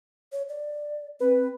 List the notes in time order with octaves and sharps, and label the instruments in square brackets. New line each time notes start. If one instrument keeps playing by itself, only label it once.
[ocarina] C#5
D5
[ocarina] C4 [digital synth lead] B4